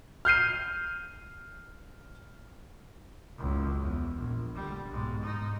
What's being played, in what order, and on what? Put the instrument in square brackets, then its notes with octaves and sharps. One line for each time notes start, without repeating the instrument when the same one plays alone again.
[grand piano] F6 G6 C7 D#7
[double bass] F#1 C#2
E2
A#1
D3 G3
B1 G#2
G#2 D#4